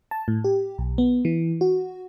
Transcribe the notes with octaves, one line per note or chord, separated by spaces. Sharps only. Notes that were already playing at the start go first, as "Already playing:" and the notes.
A5
A2
G4
B1
B3
E3
F#4